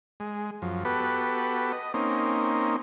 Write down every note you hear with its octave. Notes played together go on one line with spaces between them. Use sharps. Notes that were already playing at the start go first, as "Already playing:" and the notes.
G#3
F#2 F3
B3 F#4 G4 A4 B4
D#5
A#3 C4 C#4 D#4